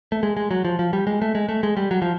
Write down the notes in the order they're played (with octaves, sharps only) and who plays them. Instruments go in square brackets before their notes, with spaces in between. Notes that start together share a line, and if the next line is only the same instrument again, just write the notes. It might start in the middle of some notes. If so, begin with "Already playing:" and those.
[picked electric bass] A3
G#3
G#3
F#3
F3
F3
G3
G#3
A3
G#3
A3
G#3
G3
F#3
F3